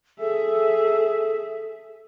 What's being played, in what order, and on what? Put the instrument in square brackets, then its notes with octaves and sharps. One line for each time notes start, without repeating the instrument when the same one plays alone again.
[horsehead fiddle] G#4 E5 [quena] A4